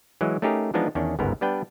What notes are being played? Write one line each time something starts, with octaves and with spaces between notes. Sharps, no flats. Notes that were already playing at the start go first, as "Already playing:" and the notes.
E3 F#3 G#3
A3 C#4 D#4 G4 G#4 A#4
E3 F3 G#3 B3 D4 D#4
E2 D#3 C#4 D4
G1 C#2 G#2 B3 A#4
G3 B3 D4 B4 G5